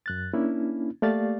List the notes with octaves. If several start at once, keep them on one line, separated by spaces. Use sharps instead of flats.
F#2 F#6 A6
A#3 C#4 D4 E4
A3 A#3 G4 D5 F5 A6